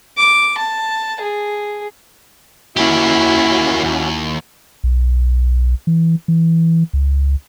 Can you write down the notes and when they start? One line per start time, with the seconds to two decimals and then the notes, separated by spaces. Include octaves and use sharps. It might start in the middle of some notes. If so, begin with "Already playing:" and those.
0.18 D6
0.58 A5
1.20 G#4
2.76 A#3 C#4 E4 F#4 G4
3.84 D#2
4.84 B1
5.87 E3
6.28 E3
6.93 C#2